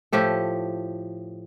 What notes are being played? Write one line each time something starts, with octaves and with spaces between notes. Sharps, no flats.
A2 F3 G4 A4